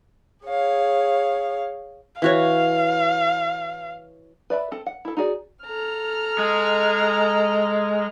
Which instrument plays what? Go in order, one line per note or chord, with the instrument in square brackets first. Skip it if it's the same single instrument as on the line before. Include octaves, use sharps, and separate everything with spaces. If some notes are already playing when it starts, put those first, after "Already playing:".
[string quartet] G#4 C#5 F5
[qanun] E3 F#4 C#5 [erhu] F5
[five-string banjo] B4 D5 E5 B5
C4 A4
F#5
E4 A4
D#4 F#4 G#4 D5
[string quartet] A4 A#5 F6
[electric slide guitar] G#3